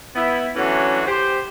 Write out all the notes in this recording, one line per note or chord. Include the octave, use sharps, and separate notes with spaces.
B3 E4
E3 F#3 A3 C#4 D4 F#4
G4 C5